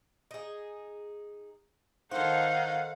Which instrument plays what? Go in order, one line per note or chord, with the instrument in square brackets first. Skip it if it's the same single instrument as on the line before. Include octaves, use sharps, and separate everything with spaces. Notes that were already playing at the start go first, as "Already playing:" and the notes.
[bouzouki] D#4 G#4
[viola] D#3 D#4 [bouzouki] A4 C5 [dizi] F5 [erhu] F#5